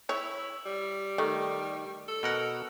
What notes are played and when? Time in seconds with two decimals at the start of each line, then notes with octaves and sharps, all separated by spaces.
0.09 E4 C#5
0.66 G3
1.18 D#3 A3
2.08 A4
2.23 B2 A#4 F#5